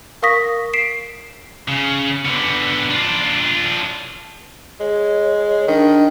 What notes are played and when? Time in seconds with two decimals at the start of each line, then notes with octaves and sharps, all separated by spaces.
0.22 A#4 F5 C#6 D#6 A#6 B6
0.73 B6 C7 D7 E7
1.68 C#3
2.25 D3 B3
2.90 D4 F4
4.80 G#3 C#5
5.68 D#3 D4